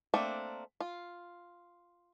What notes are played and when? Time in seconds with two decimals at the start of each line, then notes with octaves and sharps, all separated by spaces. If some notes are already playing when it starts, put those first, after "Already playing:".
0.14 A3 A#3 C4 D4
0.80 F4